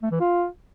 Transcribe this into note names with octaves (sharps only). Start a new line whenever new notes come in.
A3
E3
F4